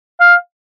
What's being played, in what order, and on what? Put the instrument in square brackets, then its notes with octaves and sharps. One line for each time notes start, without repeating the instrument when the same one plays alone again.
[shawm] F5